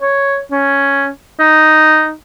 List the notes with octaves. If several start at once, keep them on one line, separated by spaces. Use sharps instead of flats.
C#5
C#4
D#4